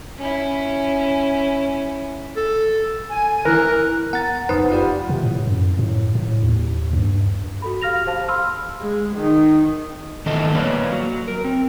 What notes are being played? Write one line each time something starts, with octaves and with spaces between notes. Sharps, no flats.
C#4 E4
A4
G#5
E3 A#4 F#6
B3 F#5 A#5 A6
F1 F#2 D#4 B4 C5 F#5 D#6
F4 G4 C5 D5 B5
C3
A2
F#2
A2
A2
D#2
G2
F#4 A4 B5
G4 F5 F6 A#6 F7
G4 C5 F5 A5
F5 B5 C6 E6 F6
G#3
D#3
D#3 E3 A3 B3 A4 D#5
A#3 B4 C#5 D5 F5
F#3
A#4
C4